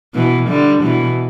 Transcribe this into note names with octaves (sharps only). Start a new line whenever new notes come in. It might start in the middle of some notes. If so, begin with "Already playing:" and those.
B2 E3
D3 G3
B2 E3